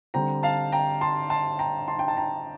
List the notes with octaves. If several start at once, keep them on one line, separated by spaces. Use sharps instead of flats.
D3 G3 C4 G5 A#5
F5 A5
G5 A#5
A5 C6
A5 C6
G5 A#5
A5 C6
G5
A5
G5 A#5